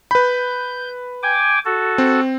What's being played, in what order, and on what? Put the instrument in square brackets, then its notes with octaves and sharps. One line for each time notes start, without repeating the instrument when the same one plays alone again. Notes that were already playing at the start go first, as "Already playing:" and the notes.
[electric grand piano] B4 B5 [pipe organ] G6
[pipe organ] G5 G#5 D6
F#4 A4
[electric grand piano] C4